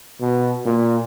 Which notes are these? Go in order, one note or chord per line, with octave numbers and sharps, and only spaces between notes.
B2
A#2